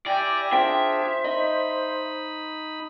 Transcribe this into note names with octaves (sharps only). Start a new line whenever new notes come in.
E4 G4 D5 G#5 A#6
D4 F4 G#4 C5 E5 G5
D#4 D#5 B5